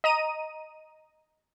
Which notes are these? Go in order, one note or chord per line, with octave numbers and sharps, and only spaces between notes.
D#5 A#5 D#7